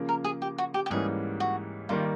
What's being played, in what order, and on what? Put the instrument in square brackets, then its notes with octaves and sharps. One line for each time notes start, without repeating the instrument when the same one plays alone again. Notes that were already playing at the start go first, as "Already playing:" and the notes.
Already playing: [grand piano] C#3 F3 A#3
[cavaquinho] A#4
G#4
G4
F#4
G4
G4
[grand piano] G#2 E3 G3 A#3 C#4 [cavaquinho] G#4
[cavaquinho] F#4
[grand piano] D#3 G3 A#3 [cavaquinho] F4